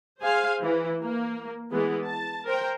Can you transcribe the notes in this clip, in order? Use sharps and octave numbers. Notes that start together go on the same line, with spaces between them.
G#4 C5 F5 G#5
E3
A#3
E3 G#3 B3
A5
A#4 C5 G5